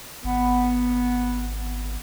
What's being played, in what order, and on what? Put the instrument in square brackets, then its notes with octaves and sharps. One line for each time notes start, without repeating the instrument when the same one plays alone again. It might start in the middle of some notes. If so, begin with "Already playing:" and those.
[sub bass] G#1 [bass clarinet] B3